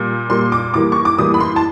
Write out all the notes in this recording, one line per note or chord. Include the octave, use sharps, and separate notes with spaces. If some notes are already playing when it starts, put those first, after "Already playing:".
Already playing: A#2 G3 A#3
A#2 G3 A#3 C6
D6
A2 E3 G3 A#3 D6
C#6
D6
A2 E3 G3 A#3 D#6
B5
C6
A5